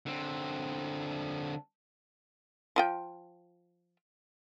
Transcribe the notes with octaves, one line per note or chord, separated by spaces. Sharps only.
D3 C4
F3 F4 G5